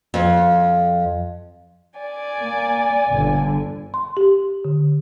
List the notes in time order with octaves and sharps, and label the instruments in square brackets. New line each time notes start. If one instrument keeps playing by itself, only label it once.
[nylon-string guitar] F2
[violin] D5 G#5
[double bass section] A#3
G1 D3
[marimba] C6
G4
D3